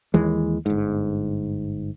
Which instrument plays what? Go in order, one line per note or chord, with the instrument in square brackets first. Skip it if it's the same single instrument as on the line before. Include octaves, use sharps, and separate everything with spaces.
[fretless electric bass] D#2 E3 G#3
G1 G#2